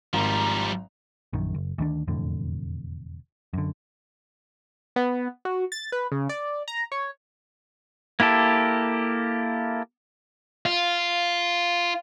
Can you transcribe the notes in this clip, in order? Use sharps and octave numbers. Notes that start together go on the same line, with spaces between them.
G#1 F3 G3 A#5
A#1 F#2 D#3
F#1
D2 D#3 D4
E1 F2 A2 D3
F#2 D3
B3
F#4
A6
B4
C#3
D5
A#5
C#5
A#3 E4 G4 A4
F4